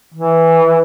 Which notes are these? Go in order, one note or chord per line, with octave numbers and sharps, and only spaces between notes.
E3